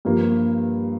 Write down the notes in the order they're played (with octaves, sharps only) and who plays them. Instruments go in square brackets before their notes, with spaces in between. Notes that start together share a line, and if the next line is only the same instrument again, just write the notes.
[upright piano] G2 F3 A#3